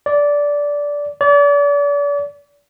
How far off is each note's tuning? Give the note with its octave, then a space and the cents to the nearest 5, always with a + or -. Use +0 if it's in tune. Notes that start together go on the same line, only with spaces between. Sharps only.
D5 -15
D5 -40